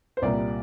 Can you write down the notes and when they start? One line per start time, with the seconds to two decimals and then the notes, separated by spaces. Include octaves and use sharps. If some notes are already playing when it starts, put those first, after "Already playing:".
0.17 C5
0.22 C2 A#2 G3 A#3 D5